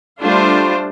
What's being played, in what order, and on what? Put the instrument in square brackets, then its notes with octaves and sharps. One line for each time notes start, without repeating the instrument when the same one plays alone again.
[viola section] G3 A3 D4 F4 C5